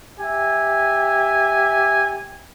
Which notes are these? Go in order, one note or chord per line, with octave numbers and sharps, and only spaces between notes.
G4 E5 G#5